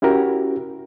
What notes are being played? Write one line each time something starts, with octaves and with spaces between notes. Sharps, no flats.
C#4 E4 F#4 G4 A#4